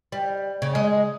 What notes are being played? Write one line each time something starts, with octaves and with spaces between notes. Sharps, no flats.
G3
C#3
G#3